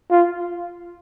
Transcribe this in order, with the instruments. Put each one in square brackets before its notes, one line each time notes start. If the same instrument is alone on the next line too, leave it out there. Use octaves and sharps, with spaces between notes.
[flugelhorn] F4